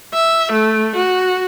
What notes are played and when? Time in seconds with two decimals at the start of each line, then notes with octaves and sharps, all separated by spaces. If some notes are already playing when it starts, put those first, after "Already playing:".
0.14 E5
0.52 A3
0.96 F#4